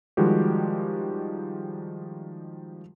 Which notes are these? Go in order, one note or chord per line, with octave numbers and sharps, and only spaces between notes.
D#3 F3 G3 G#3 F#4 G4